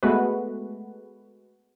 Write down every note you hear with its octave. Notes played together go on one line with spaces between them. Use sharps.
G#3 A3 B3 F#4 B4